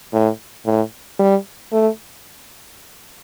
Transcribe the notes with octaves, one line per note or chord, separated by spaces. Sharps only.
A2
A2
G3
A3